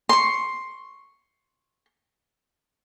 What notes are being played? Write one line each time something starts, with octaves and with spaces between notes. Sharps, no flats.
C6 C#6